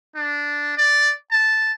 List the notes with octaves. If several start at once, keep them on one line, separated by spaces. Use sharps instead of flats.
D4
D5
A5